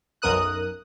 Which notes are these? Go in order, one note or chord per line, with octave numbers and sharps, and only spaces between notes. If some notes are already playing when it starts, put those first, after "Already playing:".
B1 F#2 A#4 D#6 F#6